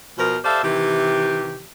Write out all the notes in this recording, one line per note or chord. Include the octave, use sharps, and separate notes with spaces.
B2 F3 A#4
G4 A4 C5 D5 E5 F5
C3 D#3 E3 G4